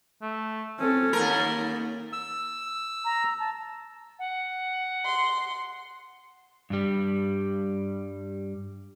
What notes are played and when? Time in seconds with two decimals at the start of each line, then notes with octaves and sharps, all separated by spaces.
0.22 A3
0.79 C4 C#4 A4
1.13 D#2 A#3 A#4
2.13 E6
3.05 A#5
3.40 A5
4.19 F#5
5.06 C6
6.70 G2 G3